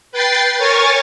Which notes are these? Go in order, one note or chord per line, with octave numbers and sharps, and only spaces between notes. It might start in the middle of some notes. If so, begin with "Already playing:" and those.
B4 G5 A6 C7
A#4 C#5 G#5 C#6 A6